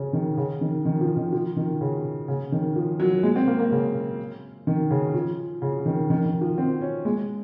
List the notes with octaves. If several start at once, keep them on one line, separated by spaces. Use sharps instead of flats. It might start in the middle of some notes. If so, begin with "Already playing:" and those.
Already playing: C#3
D#3
C#3
D#3
D#3
F3
D#3
F3
D#3
C#3
C#3
D#3
F3
F#3
G#3
C4
A#3
A#3
C#3
D#3
C#3
F3
C#3
D#3
D#3
D#3
F3
C4
C#4
G#3